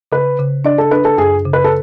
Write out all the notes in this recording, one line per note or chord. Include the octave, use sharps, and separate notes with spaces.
C#3 B4
C#3
D4 D5
A4
D4 B4
A4
F#2 G#4
C#3
B4
A4